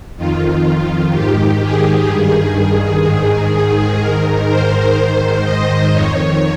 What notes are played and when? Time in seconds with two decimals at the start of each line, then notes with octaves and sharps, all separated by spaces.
0.17 F2 D#3 F4
0.66 F4
1.12 G#2 D#3 G4
1.61 G#4
2.08 G2 D#3
3.04 G#2 D#3 G#4
3.53 G#4
4.00 G#2 D#3 A#4
4.48 C5
4.97 G#2 D#3
5.44 D#5
5.91 F2 D#3 C#5